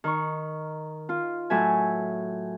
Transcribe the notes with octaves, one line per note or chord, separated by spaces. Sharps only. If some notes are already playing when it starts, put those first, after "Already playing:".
D#3 C#6
F4
A2 F#3 E5 G#5